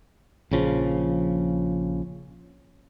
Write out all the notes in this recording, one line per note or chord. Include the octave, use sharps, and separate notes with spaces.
A#1 C#3 F3